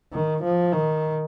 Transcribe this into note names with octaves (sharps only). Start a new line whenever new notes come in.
D#3
F3
D#3